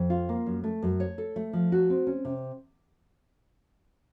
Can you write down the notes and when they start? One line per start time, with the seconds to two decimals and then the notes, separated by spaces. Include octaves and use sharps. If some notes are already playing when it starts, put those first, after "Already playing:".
Already playing: F2
0.10 F4
0.29 A#3
0.46 F#2
0.64 A3
0.82 F#2
1.00 C#5
1.18 A4
1.36 A3
1.53 F3
1.72 F#4
1.90 C4
2.07 C#4
2.25 C3